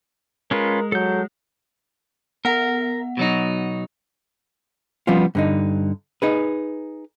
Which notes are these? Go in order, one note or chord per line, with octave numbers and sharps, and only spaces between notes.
G#3 C#4 F4 A#4 B4
F#3 A4 G6
B3 A#4 F#5
B2 F#3 D#4
F3 G3 B3 C#4 F4
G2 D3 D#4
D#4 G#4 B4